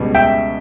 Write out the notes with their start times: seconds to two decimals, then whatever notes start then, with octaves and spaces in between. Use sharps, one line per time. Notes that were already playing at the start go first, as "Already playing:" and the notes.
Already playing: C#2 B2 G3
0.15 E5 G5